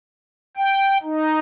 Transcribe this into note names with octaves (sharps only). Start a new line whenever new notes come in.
G5
D#4